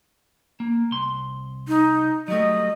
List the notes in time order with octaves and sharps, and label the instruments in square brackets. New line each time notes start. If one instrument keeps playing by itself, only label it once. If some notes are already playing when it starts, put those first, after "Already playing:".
[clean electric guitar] A#3
C2 C6
[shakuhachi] D#4
[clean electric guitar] F#3 G3 A3 [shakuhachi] D#5